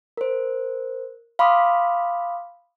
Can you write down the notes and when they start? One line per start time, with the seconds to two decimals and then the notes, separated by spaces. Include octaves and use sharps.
0.17 A#4 C5
1.39 F5 B5 C6 D6 D#6